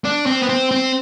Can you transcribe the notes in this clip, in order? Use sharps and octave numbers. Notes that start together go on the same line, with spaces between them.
D4
C4
B3
C4
C4